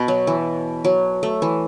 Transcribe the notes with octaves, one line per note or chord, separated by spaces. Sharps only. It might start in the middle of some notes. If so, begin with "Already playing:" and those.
Already playing: B2 B3
F#3
E3
F#3
A3
E3